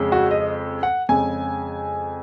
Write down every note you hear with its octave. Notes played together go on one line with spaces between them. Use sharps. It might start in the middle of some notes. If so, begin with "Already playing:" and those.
Already playing: F2 C#3 G#3
F#4
D#5
F#5
F2 C#3 G#3 G#5